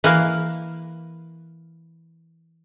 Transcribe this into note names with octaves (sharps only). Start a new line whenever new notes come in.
E3 A#3 F5